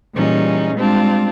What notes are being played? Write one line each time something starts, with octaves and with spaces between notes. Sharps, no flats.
A#2 E3 G3 C#4 D#4 G#4
G3 G#3 C4 D4 F4